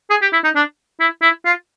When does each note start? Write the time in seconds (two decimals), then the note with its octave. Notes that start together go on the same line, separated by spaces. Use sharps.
0.10 G#4
0.22 G4
0.33 E4
0.44 D#4
0.55 D4
1.00 E4
1.22 E4
1.45 F4